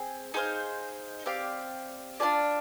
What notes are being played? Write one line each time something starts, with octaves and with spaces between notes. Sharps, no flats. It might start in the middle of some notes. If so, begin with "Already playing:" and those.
Already playing: C4 G#4
D#4 G#4 C5 F5
C4 G4 D5 F5
D4 F4 G#4 D5